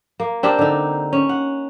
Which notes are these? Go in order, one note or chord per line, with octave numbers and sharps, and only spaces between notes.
A#3
C4 D4 G4 A#4
D3 D#4
C#4
F#5